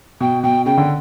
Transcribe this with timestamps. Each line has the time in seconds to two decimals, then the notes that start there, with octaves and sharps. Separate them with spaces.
0.21 B2 G5
0.43 B2 G5
0.66 C#3 G5
0.77 D3